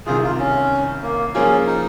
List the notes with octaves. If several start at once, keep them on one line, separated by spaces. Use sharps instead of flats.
C2 C3 D#3 F4 G#4
F4
C#4
A#3
F3 A#3 C#4 F4 G#4
D#4